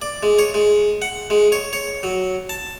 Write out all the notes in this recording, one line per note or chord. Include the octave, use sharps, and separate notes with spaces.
D5
G#3
C#5
G#3
F#5
G#3
C#5
C#5
F#3
A5